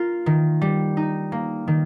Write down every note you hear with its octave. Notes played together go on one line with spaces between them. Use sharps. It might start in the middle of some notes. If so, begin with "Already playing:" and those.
Already playing: A#3 F4 A#4
D#3
G3
D#4
A#3
D#3